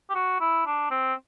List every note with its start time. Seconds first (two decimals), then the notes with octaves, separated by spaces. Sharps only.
0.10 G4
0.15 F#4
0.40 E4
0.66 D4
0.91 C4